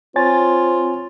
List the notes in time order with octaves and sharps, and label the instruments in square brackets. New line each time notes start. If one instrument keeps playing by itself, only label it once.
[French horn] C4 [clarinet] F4 [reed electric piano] C#5 G#5 A6